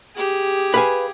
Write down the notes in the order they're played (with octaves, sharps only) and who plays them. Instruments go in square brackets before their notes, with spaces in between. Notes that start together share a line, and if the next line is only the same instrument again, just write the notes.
[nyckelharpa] G4 G#4
[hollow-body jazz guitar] B4 F5 G#5